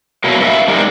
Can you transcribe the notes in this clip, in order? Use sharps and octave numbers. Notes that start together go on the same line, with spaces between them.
B2 F#3 A#3 E4
G2 G3 E4 F#4 E5 F5
G#3 D4 D#4 G4 A#4